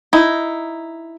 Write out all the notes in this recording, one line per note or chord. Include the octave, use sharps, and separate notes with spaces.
D#4 E4